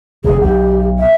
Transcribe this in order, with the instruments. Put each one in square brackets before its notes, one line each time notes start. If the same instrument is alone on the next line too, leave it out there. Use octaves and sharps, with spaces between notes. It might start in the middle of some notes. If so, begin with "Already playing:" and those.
[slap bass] F1 D3 [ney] G#4
[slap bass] B1 [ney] G4
[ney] E5